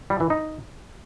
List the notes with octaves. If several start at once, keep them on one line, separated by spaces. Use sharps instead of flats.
G3
E3
D#4